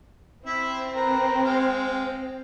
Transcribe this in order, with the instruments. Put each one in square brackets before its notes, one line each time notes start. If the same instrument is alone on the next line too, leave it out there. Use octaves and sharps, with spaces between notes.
[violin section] C4 [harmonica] E4 E5
[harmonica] A#4 B4
G#3 F5 G5